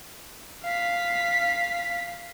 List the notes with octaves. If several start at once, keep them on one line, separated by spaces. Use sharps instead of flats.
F5 B6